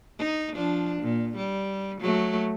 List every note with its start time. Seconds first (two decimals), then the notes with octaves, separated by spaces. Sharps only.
0.19 D#4
0.53 F3 D4
1.02 A#2
1.37 G3
2.01 F#3 A3